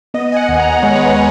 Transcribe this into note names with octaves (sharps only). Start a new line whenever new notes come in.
B3 D#5
G#5
F#5
D#2
A#5
G#3 C#5
B4
C#5